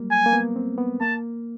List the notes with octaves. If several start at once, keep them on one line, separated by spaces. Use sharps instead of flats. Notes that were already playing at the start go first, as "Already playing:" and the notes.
Already playing: F#3 G3 A#3
G#5
A#3
B3
C4
B3
A#3 A5